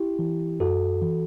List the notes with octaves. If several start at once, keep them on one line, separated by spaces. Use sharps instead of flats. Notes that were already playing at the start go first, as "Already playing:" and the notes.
Already playing: E4 G4
E3
F#2 F#4 A4
E3